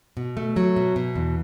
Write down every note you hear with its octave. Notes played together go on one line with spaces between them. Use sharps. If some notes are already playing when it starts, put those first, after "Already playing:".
B2
A3
F#3
B2
B2
E2